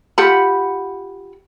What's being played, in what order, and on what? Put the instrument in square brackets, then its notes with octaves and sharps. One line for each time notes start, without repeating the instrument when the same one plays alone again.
[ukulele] F4 G4 F#5 B5